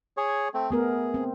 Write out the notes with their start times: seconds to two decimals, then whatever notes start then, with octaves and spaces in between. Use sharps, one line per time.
0.17 G#4 C#5
0.54 A3 C4
0.71 A3 B3 G#4 A#4
1.14 C4